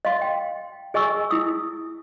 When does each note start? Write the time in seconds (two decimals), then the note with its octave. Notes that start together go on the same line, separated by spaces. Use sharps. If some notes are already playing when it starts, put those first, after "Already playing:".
0.05 D#5 F5 C6
0.22 G5
0.94 G#4 D#5 G#5 C#6 E6
1.31 E4 D#6